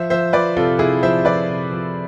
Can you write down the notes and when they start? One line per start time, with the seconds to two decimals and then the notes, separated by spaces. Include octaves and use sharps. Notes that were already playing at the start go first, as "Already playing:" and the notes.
Already playing: F3 C5 E5
0.10 F3 C5 E5
0.33 F3 B4 D5
0.57 C3 F4 A4
0.79 C3 E4 G#4
1.03 F3 C5 E5
1.25 F3 B4 D5
1.49 C3
1.72 F3